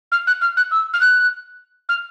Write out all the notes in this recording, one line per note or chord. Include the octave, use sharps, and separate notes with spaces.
F6
F#6
F6
F#6
E6
F6
F#6
F6